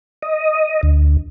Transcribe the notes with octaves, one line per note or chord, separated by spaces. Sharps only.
D#5
D2